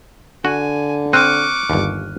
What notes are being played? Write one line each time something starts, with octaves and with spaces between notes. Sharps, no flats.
D3 F#4 G#5
C4 C#6 D6 F6 F#6 D#7
G1 D#2